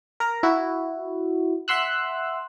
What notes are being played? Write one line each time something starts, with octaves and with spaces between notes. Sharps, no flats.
A#4 A#5
E4 F#4
E5 F#5 C6 E6 F#6